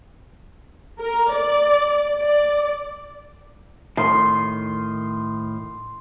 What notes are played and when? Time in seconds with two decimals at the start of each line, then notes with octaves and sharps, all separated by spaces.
1.01 A#4
1.34 D5
2.16 D5
3.97 A2 D#3 C6